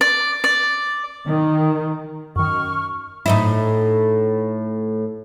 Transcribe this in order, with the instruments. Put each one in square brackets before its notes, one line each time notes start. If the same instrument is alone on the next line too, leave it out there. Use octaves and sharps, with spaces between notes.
[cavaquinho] D5
D5
[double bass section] D#3
[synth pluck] F#2 D#3 [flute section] C#6 F6
[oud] A2 D#4 E4